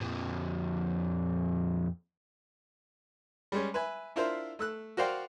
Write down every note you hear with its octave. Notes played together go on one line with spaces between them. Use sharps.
F2 A#2
G3 G#3 C#4
B4 E5 G#5
D4 E4 F4 A#4 C5 E5
A3 E6 F#6
F#4 A#4 C5 D5 F5 G5